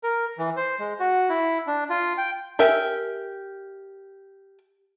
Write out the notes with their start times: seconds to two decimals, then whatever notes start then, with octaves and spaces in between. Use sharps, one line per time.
0.03 A#4
0.38 E3
0.57 C5
0.79 G#3
1.00 F#4
1.29 E4
1.67 D4
1.90 F4
2.18 G5
2.59 G4 A#4 E5 G#5